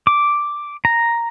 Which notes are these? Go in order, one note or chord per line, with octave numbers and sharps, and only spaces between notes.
D6
A#5